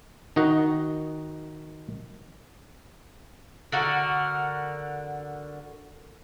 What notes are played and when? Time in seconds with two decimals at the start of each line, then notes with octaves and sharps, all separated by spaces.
0.36 D#3 D#4 F#4 D#5
3.72 D3 F#4 A#4